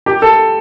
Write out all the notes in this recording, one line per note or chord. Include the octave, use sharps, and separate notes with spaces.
G4
A4